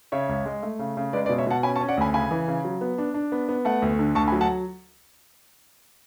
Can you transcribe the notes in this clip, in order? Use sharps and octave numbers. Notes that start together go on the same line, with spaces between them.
C#3 C#5 E5
C#2
G#3
A3
C#3
C#3
G#3 B4 D5
B4 D5
B2
C#5 E5
B2 F#5 A5
C#4 G#5 B5
A5 C#6
C#4
D5 F#5
D2 G#5 B5
C#3 G#5 B5
E3
C#3
F#3
B3
D4
D4
B3
B3
A3 F#5 A5
D2
D3
D2 A5 C#6
G#5 B5
F#3
F#5 A5